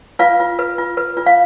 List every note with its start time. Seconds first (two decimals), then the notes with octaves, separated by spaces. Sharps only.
0.19 F4 B4 F5
0.40 F4
0.59 B4
0.78 F4
0.97 B4
1.17 F4
1.26 F5